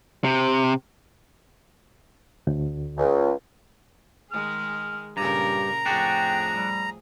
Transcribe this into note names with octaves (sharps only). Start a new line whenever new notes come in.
C3
D2
C#2
D#3 G#3 G#4 F6
G2 A#2 C#3 G4 A#4 A#5
F2 A2 D4 F#4 G#4 G5
G3